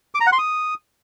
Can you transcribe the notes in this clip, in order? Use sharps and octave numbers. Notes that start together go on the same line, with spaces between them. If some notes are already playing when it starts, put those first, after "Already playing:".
D6
A#5
F#5
C6
D#6